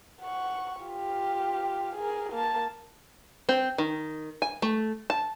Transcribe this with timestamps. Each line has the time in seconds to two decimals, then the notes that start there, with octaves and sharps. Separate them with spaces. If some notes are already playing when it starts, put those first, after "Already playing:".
0.21 F#5 C#6
0.82 F4 G4
1.96 G#4 A#4
2.33 A#3 A5
3.49 C4
3.78 D#3
4.42 G#5
4.62 A3
5.10 A5